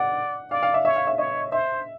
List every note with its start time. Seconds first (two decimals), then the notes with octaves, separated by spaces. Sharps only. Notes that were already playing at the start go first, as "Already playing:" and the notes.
Already playing: D5 F#5
0.51 D5 F5
0.63 F5
0.74 E5
0.85 C#5 E5
0.96 F5
1.07 E5
1.18 C#5 D#5
1.52 C5 E5